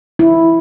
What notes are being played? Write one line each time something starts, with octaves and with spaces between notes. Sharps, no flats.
E4